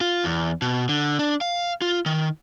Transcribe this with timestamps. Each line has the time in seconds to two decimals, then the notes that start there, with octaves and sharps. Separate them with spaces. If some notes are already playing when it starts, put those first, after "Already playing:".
0.01 F4
0.24 E2
0.62 B2
0.89 D3
1.19 D4
1.41 F5
1.82 F4
2.06 D#3